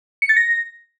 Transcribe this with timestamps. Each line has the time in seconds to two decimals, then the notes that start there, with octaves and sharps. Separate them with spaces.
0.22 C#7
0.29 A6
0.37 A#6